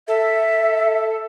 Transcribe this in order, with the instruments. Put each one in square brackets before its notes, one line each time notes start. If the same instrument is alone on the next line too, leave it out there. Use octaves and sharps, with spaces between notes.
[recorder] A4 [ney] E5